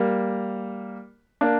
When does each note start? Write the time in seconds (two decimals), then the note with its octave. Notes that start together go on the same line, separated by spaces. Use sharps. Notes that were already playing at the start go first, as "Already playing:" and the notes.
Already playing: G3 A#3
1.41 A#3 D4